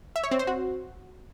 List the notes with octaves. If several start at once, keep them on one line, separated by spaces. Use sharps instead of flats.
E5
C#5
C4
C5
F#4